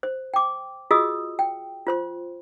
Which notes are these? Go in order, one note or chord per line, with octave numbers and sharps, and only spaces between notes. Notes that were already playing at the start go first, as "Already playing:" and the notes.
C5
G5 D6
F4 F#4 G#4 D#5 D#6 E6
G5
F4 C5 C6